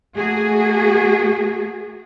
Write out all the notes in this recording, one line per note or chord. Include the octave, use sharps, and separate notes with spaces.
A3 A#3 F#4 G#4